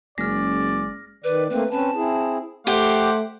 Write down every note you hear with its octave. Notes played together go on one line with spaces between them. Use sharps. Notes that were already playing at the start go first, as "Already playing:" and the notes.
F#1 G#3 C#4 G#4 D5 F6 A#6
D#3 B4 D5
A3 A#3 C4 B4
C4 C#4 B4 A5
C4 E4 G#4
A3 G4 C5 F#5 D6